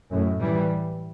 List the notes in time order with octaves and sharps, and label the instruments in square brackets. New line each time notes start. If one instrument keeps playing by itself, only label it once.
[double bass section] F#2 A2
E3 G3